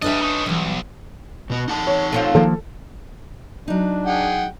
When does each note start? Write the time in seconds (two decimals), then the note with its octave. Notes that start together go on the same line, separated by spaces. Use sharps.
0.02 G3 D4 B4 D#5 E5
0.22 C#4 D#4
0.46 B1 E3 G3
1.50 B2 B3
1.68 D#4 F#5 A5
1.87 C#5
2.12 A3 C4 F4
2.35 D#3 F3 A#3 A4
3.68 F#3 D4 D#4
4.07 G#4 F#5 G5